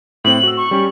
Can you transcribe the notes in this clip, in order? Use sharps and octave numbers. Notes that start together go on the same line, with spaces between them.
A2 C4 F#7
F#4 E6
C#6
G3 C#4 G4